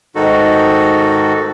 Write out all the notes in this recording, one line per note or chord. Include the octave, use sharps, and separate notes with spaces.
G#2 D#3 D#4 F#4 A4